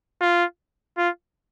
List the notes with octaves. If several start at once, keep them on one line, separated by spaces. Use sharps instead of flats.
F4
F4